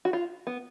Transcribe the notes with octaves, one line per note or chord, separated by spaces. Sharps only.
F#4
F4
B3